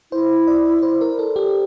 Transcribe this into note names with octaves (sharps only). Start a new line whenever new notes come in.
E4 C5
D5
C5
A#4
A4
G4